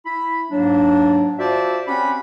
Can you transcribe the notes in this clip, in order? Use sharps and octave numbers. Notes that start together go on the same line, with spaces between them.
E4 B5
G#2 F#3 A#3 D4
F4 F#4 C5 D5 E5 A5
C4 C#4 G4 F#5 B5